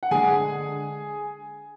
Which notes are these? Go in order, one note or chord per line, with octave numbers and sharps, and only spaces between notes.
F#5
D3 G#3 G#4 G#5